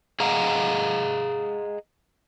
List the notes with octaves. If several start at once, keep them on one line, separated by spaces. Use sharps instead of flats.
G#4 D#5 F5 F#5 A#5